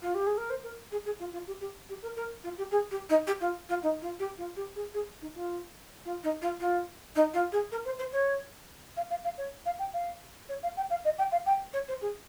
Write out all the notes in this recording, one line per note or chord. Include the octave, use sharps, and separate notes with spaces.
F4
G4
G#4
A#4
C5
A#4
G#4
G#4
F4
F4
G4
G4
G4
A#4
A#4
F4
G4
G#4
G4
D#4
G4
F4
F4
D#4
F4
G4
F4
G4
G#4
G#4
D#4
F4
F4
D#4
F4
F4
D#4
F4
G#4
A#4
C5
C5
C#5
F5
F5
F5
C#5
F5
G5
F5
C#5
F5
G5
F5
D#5
G5
F5
G5
C#5
C5
G#4